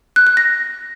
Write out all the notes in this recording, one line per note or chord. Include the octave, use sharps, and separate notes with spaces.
F#6
F#6
A#6